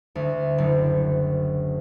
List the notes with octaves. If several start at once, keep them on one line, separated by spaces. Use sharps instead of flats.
D2
F#1